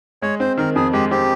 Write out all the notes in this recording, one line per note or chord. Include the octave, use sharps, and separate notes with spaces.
G#3 C#5
C4 C5
D#3 A#4
F2 G#4
G#3 G4
C4 G4